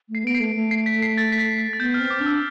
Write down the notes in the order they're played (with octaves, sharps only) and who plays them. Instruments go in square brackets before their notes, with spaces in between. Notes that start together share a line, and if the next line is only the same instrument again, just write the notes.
[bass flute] A3
[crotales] C7
[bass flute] B3 [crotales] D7
[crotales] C7
[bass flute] A3
A3
[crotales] C7
B6
C7
A6
B6
A6
B6
A6
[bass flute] B3 [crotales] G6
[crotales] F6
[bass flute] C4
[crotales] D6
[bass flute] D4
[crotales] E6